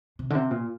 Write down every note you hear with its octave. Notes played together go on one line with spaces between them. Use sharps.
C3
D3
C3
A#2